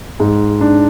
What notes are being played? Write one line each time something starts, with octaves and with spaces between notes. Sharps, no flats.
G#2
D4